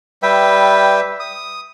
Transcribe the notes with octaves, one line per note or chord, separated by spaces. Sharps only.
G3 B4 E5 G5
D#6